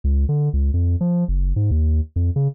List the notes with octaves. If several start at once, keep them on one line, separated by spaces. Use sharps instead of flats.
C#2
D3
C#2
F2
F3
F#1
G#2
D#2
F2
C#3